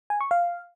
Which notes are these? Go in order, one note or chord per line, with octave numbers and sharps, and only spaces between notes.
G#5
C#6
F5